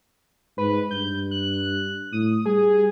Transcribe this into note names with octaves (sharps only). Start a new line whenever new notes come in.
G#2 B4
G2 G6
F#6
A2 D#6
G3 G#4